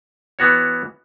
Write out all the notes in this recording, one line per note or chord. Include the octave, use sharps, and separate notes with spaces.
E3 B3 F#4 C#5